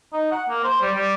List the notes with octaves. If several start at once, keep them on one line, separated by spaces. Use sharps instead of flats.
D#4
F#5
A#3
C5
G3
G3